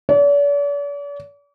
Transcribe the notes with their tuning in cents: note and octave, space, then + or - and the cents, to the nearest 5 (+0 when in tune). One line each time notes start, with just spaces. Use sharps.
D5 -45